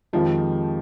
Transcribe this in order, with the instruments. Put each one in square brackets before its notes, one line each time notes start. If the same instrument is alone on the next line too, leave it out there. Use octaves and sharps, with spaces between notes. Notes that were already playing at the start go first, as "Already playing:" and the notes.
[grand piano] F2 D#3 G#3 D#4 G4 [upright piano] F3